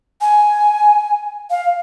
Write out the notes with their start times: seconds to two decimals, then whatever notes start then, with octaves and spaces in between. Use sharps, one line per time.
0.21 G#5
1.51 F5